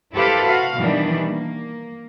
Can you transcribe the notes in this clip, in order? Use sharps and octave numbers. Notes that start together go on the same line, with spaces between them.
E4 G4 A4 B4 C5 F5
F#4 F5
B2 D#3 E3 G3 D4
A#3